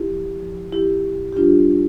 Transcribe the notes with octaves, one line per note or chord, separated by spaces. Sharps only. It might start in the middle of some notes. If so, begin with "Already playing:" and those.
Already playing: E4 G4
F3
F3
A2 E4 G4
A2
G4
G3 D4 F4